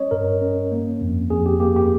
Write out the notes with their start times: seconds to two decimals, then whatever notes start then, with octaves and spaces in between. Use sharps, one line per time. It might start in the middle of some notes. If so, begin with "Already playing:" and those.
Already playing: G3 C#4 C#5 D#5
0.11 G2 A#4
0.42 C#4
0.72 A#3
1.01 F2
1.30 F2 G#4
1.46 G4
1.60 A#3 G4
1.76 G4